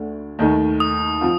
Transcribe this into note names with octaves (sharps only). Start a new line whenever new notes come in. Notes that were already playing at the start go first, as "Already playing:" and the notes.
Already playing: D2 D3 A3 D4
D#2 D#3 A3 D#4
D#6
F3 C4 F4